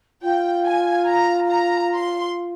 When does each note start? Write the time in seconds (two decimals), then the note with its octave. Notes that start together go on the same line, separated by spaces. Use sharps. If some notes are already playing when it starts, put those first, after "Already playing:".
0.22 F4 G5
0.65 G#5
1.09 A#5
1.51 A#5
1.94 C6